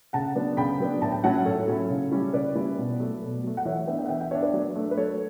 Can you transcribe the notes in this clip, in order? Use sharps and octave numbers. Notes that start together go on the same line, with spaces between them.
C#3 F#5 A5
F#3 B3 D4
C#3 G5 B5
F#3 B3 D4
A2 A5
G5
F#3 C#4 E4 F#5 A5
A2 A4 C#5
F#3 C#4 E4
C#3
G3 C#4 E4
C#3 B4 D5
G3 C#4 E4
B2
F#3 A3
B2
F#3 A3
F#5
E3 C#5 E5
B3 D4 E5 G5
E5 G5
F#5
E3 E5 G5
E5 G5
B3 D4 C#5 E5
B4 D5
F#3
A3 D4
B4
F#3 A4 C#5